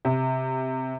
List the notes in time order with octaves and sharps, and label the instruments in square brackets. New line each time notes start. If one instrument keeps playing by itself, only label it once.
[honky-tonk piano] C3